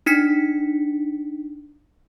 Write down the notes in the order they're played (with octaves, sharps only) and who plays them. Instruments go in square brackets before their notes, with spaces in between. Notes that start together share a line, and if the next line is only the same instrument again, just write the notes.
[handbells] D4 D#4 B6 C#7